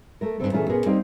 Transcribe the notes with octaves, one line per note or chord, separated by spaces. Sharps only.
A3 A#4
G2 B2 D3 D#3 C4 A4
A#2 E3 A3 C#4 F4 G#4
A#2 B3 C#4 G#4 A#4
G3 A#3 C4 D#4